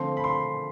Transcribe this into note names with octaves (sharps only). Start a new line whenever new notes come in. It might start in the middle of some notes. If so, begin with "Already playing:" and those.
Already playing: D3 F3 A3 C4 C6
B5
C6